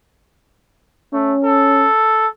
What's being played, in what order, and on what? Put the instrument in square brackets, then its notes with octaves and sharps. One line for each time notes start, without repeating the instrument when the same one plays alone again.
[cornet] A3 [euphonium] C#4
[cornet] A4